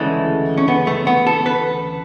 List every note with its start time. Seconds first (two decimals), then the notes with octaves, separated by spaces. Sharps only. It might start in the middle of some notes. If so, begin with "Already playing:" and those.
Already playing: D2 C#3 E3 G#3 A3
0.58 C#4
0.68 B3
0.87 A3
1.07 B3
1.27 A4
1.46 B4